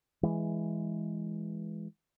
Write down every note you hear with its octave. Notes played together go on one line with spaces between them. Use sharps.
E3 G#3